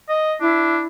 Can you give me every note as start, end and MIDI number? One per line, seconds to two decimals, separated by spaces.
0.09 0.34 75
0.41 0.81 62
0.41 0.86 64